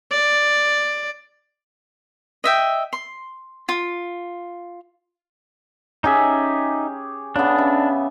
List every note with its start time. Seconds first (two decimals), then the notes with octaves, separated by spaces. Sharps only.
0.11 D5
2.44 D#5 E5 G5
2.93 C6
3.69 F4
6.04 C#4 D#4 G4 G#4 E5
7.36 C#3 B3 D4
7.58 E5